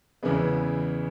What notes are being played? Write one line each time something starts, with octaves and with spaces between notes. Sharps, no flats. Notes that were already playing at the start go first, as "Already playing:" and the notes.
E2 C#3 E3 G#3 B3